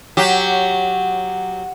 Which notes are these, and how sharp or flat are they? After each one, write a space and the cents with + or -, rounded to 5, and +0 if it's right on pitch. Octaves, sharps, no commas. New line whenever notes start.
F#3 -5 G4 +0